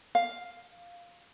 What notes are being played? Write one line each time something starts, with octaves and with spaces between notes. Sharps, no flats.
F5